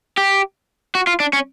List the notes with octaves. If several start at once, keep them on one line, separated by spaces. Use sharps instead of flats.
G4
F#4
F4
D4
C#4